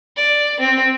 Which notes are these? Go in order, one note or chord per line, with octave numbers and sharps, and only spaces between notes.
D5
C4